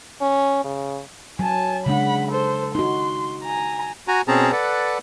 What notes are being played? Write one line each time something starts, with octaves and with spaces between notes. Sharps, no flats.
C#4
C#3
F#3 G#5 A5
C#3 G#3 D4 F#5 B5
A4 C5
D#4 F#4 C6
G#5 A#5
F#4 G#5 A#5
B2 C4 C#4 G#4 A5 A#5
A4 B4 D5 F#5